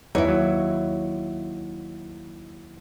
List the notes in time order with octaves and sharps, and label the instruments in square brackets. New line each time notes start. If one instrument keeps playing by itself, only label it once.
[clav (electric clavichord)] E2 E3 D#4 [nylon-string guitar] E4 C#5
[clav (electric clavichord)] D#2 F#3